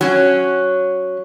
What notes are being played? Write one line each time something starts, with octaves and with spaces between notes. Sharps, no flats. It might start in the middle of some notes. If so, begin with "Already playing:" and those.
F#3 C#4